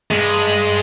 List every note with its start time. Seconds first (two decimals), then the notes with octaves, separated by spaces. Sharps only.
0.11 G2 G#3